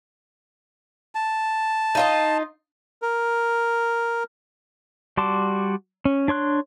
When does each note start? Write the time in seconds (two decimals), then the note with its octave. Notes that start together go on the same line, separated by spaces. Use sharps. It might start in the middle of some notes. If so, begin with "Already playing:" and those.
1.15 A5
1.95 D#4 F4 D#5
3.02 A#4
5.17 G3 F#4 A5 C6 D6
6.05 C#4
6.28 D4 C#5 C6 F#6